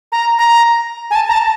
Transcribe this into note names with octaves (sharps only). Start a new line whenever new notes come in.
A#5
A#5
G#5
A5
A#5
A5